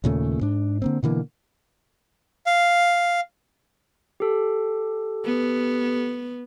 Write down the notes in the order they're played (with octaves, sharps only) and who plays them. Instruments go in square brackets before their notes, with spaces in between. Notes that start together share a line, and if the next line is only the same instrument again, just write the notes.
[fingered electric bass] D#2 A#2 C#3 A3
G#2 D4
D3 A#3 C4
B2 D3 E3 A#3
[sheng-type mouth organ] F5
[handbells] G4 A4
[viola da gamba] B3